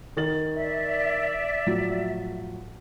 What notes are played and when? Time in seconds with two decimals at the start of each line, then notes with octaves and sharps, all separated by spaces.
0.17 D#3 A6 F#7
0.53 D5 E5
1.66 A2 F3 F#3